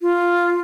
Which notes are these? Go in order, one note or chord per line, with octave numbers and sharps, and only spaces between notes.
F4